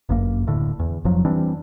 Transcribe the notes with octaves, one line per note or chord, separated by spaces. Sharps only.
G1 F#2 A#3
D1 A2 D3
E2
F1 F2 F3 F#3
E3 G3 C4 D4